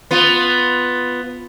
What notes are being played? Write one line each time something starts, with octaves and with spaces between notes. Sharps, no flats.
B3 F4